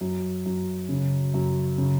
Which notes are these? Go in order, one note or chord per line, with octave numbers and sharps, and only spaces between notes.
F#2
F#2
C#3
F#2
C#3